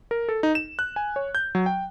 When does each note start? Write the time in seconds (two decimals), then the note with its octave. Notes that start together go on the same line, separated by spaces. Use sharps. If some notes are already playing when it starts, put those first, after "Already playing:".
0.11 A#4
0.29 A4
0.43 D#4
0.55 E7
0.79 F#6
0.96 G#5
1.16 C#5
1.35 G6
1.55 F#3
1.66 G5